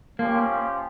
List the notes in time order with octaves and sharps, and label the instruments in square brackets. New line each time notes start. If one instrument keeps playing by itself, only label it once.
[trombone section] F3 C#4 G4 [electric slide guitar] A#3